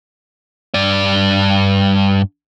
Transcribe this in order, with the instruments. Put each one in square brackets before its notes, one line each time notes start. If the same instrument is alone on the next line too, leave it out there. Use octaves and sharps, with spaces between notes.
[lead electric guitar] G2 D5